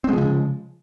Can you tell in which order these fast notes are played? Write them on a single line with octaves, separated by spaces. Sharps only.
C4 G#3 F3 C#3